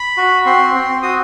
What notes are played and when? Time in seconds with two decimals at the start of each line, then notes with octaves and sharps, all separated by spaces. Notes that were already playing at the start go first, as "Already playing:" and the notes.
Already playing: B5
0.17 F#4
0.46 C4 C6
0.75 C4
1.03 F#4 D#6